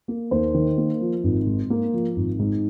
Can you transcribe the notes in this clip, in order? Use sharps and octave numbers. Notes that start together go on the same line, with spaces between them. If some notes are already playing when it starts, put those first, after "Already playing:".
A#3
D#2 C5
D#3
A#3
F3
G#1
G#2
A#3
F3
G#1
G#2